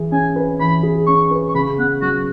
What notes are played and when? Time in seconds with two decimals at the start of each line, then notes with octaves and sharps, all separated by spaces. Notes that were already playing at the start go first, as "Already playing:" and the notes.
Already playing: E3 G#4
0.12 C#4 G#5
0.36 B4
0.60 E3 B5
0.83 G#4
1.07 C#4 C#6
1.31 B4
1.49 C#6
1.55 C#3 B5
1.79 B3 F#5
2.02 F#3 F#4